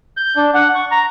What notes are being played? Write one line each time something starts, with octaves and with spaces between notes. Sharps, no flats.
G6
D4
F#5
C#6
A#5